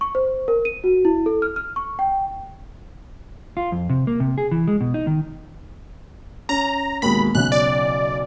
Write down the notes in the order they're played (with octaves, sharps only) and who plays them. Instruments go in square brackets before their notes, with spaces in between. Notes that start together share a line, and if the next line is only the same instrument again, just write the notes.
[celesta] C#6
C5
A#4
D#7
F#4
E4
A4
F6
F6
C#6
G5
[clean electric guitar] F4
F2
C3
A#3
C3
G#4
E3
G#3
B2
D#4
D#3
[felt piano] C#4 [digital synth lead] A#5
[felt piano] D#2 B2 G#3 [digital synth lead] B5
[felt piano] B1 C#3 [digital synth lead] F#6
[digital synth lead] D5